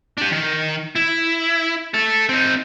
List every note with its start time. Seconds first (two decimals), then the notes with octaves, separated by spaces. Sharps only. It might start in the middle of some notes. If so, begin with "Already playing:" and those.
0.18 D4 G4
0.31 D#3
0.95 E4
1.94 A4 E5
2.29 C4 D#4